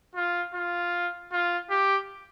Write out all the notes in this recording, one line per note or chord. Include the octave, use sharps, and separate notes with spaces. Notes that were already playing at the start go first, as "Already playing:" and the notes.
F4
F4
F4
G4